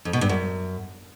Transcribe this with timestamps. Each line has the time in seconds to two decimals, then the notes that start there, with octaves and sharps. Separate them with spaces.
0.05 F2
0.13 B2
0.21 G2
0.29 F#2